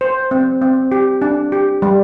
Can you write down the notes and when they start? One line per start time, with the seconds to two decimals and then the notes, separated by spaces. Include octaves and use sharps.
0.01 C5
0.31 C4
0.62 C4
0.92 G4
1.22 D4
1.52 G4
1.82 G3